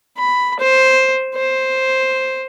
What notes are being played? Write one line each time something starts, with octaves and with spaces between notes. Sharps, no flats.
B5
C5
C5